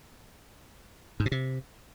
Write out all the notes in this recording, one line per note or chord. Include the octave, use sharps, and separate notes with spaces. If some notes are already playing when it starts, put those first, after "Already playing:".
G#2
B2
C3